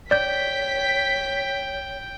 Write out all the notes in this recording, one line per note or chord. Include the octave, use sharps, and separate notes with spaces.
C#5 D5 G5 G6 B6